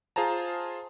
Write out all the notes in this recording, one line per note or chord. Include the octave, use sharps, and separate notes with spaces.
F4 G#4 C5 A5 A#5